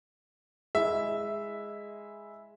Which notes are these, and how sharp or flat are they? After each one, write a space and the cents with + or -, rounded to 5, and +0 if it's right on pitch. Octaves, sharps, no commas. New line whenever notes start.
G#3 +0 E4 -10 E5 +0